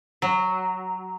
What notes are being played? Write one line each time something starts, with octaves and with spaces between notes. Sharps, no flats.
F#3